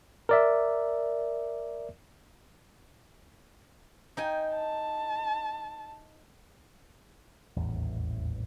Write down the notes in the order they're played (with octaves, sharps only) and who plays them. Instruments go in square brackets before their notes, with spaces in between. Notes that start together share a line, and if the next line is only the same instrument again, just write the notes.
[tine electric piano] A#4 D5 E5
[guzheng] D#4 G5 G#5
[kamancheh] A5
[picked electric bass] D#1 A1 E2